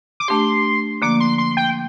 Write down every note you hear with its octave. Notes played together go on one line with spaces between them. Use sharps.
D6
A3 D4 G4 C6
D3 F3 A#3 D6
C6
C6
G5